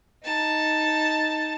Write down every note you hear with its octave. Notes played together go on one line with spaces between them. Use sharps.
D#4 A5